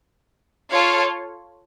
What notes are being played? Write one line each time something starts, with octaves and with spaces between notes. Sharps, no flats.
F4 A4 C#5 F5